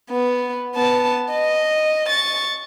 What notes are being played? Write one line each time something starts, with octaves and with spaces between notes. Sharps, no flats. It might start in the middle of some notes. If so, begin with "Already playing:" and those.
B3
B3 A5
D#5
C#6 A6